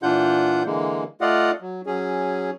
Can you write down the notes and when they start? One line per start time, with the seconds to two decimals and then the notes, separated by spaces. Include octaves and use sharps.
0.03 A#2 E3 D4 F4 F#5 G6
0.65 D3 E3 G#3 A#3
1.21 A3 F4 D5 D#5 F5 F#5
1.61 F#3
1.86 F#3 C#4 G#4